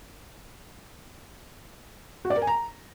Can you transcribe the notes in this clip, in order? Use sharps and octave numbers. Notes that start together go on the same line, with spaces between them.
F#4
D5
A#4
G#5
A#5